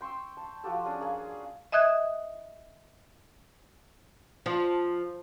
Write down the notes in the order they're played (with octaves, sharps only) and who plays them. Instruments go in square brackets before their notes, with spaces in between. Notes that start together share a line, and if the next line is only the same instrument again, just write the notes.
[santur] G5 C6 C#6 E6
A5
F3 F#4 G4 A4
C#4 D4 G#4
A#3 G#4
[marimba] D#5 E5 D#6 F#6 G#6
[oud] F3